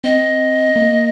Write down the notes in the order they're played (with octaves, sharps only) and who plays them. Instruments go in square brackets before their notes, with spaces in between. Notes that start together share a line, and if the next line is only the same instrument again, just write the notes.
[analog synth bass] C4 [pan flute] D#5
[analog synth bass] A#3